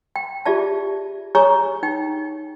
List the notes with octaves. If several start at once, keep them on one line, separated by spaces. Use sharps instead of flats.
G5
F4 G4 G#4 D5 E5 A5
G#4 C#5 G#5 A#5 C#6 D#6
D#4 G5